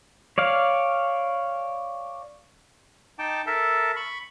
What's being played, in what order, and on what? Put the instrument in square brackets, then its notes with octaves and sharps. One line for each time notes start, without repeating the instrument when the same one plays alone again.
[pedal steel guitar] C#5 D5 F5
[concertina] D#4 G5 A5 D6
A4 A#4 E5 A5
B5 C#6